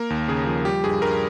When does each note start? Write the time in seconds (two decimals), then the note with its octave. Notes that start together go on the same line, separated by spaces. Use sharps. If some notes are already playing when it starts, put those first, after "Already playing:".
Already playing: A#3 A#4
0.10 D#2
0.28 C#3 G#4
0.46 F3
0.65 G3 G4
0.84 G2 G#4
1.02 G2 A#4